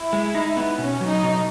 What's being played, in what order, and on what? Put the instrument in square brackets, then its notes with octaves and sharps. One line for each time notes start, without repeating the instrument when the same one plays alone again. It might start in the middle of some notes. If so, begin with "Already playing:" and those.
Already playing: [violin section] E4
[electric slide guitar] G#3
D#4
B3
[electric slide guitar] B2 [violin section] C#4
[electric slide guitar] F#3
[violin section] D#4
[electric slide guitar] B2